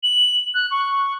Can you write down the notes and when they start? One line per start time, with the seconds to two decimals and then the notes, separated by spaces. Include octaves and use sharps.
0.03 F#7
0.54 F#6
0.71 C#6